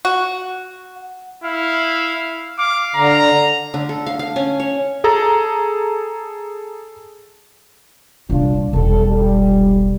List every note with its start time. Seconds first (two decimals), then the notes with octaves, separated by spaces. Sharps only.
0.05 F#4
1.44 E4 F5
2.59 F5 D6
2.95 D3 A#5
3.74 D3
3.89 A4
4.06 F5
4.19 F5
4.36 C#4
4.60 C#5
5.04 G#4 A4 A#5
8.30 C2 A#2 D4 F4
8.73 E1 B1 G3 A4
9.08 G3